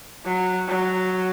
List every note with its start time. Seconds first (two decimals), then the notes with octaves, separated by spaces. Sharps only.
0.25 F#3
0.68 F#3